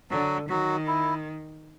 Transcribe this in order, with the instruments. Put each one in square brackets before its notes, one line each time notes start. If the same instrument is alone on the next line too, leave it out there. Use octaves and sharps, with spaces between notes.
[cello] D3 [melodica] F#3 F#4
[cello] D#3 [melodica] F#3 F#4
[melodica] E4